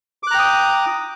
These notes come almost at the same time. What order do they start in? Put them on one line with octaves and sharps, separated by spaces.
D6 F#6 A#5 G5 D#6